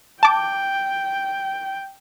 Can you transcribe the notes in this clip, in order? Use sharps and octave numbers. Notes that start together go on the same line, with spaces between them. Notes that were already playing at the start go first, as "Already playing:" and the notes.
G5 A5 D6